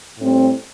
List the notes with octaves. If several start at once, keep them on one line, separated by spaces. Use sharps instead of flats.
A2 G3 C4